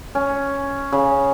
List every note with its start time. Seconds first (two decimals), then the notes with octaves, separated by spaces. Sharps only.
0.15 C#4
0.93 C#3